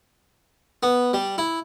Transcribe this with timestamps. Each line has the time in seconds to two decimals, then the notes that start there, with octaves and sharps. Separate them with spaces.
0.83 B3
1.13 G3
1.38 E4